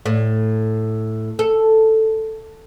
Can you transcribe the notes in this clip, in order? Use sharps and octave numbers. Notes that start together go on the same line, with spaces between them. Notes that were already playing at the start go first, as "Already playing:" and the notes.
A2
A4